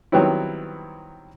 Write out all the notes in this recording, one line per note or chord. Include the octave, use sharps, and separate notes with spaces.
D#3 F#3 G3 B3 C4 E4